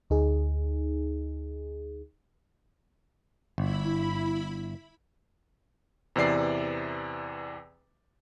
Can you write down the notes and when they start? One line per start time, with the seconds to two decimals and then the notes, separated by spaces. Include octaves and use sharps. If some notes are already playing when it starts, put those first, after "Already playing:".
0.10 D2 D#4 G#4
3.58 G1 E4 B5
6.16 E2 C3 E3 D5 C7